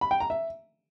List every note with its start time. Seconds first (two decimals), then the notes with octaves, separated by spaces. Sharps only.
0.01 B5
0.11 G5
0.20 A#5
0.30 E5